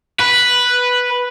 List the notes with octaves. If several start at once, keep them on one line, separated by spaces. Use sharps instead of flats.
B4